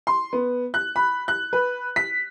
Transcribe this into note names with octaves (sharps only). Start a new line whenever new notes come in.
C6
B3
F#6
B5
F#6
B4
B6